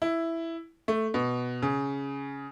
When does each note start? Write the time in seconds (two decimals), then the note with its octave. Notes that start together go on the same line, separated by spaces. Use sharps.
0.02 E4
0.88 A3
1.14 B2
1.62 C#3